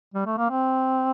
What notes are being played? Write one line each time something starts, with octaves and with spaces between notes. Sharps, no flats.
G3
A3
A#3
C4